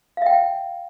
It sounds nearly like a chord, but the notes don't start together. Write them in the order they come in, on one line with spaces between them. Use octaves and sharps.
F5 E5 G5